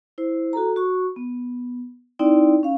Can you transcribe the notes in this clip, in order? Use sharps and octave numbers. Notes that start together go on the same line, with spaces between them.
E4 C5
F#4 A4 A#5
F#4 C#6
B3
C4 D#4 E4 D5 G5
C#4 F5